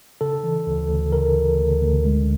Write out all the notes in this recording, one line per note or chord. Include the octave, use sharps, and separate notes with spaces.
C#3 A4
E3
D2
D2
C#3 A#4
E3
D2
D2
G#3